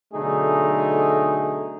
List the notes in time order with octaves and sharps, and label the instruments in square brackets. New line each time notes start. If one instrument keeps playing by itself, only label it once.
[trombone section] B1 D3 A3 D#4 G#4